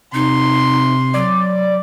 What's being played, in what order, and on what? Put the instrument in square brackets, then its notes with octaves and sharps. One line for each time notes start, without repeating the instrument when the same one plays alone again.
[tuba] C3 [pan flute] D#4 [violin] C6
[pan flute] F#3 [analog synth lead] D5